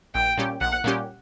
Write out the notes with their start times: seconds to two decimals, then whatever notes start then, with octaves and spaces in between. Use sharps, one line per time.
0.15 A#1 G5
0.38 A#2 G3 C#4 G4
0.61 A#1 F#5
0.84 A#2 G3 C#4 G4